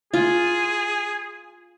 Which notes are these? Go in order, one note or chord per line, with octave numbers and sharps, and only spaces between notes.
F4 G#4